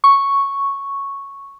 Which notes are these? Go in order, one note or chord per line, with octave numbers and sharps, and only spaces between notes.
C#6